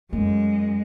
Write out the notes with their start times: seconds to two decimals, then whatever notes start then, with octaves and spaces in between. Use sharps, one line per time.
0.13 F#2 G#3 A3